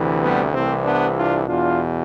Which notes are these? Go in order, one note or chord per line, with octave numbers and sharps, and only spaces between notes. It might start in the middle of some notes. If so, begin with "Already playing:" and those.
Already playing: D2 C3 E3
G3 B3
C2 C3 E3 A3 C4
B3 D4
D4 F4
E2 B2 D4 F4